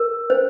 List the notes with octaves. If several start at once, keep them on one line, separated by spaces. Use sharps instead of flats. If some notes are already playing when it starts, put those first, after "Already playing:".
Already playing: A#4
C5